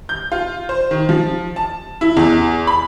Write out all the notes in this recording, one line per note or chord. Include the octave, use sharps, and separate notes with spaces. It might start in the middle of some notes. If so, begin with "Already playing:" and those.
G6
F4
C5
D#3
F3
A5
E4
E2
B5